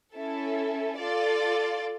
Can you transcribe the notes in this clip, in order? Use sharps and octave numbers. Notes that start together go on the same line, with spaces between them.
C#4 E4 A4
F4 A4 D5